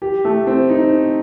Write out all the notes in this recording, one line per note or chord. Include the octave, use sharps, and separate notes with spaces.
G4
A3
C4
D#4